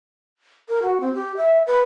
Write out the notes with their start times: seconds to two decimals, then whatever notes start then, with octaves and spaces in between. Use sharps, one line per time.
0.69 A#4
0.82 F#4
1.01 C4
1.14 G4
1.37 E5
1.67 B4